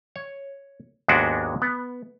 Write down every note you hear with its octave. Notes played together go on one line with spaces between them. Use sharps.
C#5
D#2 G#2 G#3 B3 D4 F#4
B3